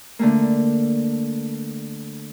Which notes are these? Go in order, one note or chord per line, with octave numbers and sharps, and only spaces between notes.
D3 A3 A#3